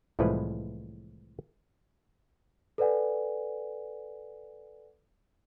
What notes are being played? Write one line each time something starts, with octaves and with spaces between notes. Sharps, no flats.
C2 A2 E3 F3 G#3 B4
A4 B4 D5 F#5 G#5